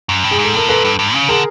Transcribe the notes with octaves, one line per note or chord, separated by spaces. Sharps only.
F#2
G2
G#4
G#2
A4
A2 A#4
A#2 A4 B4
G2
G2
C#3
D3 G#4 A#4